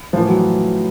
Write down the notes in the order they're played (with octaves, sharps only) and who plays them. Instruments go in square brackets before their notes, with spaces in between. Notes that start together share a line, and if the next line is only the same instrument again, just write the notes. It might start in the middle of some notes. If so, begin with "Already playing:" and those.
[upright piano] A2 F3
E3
F#3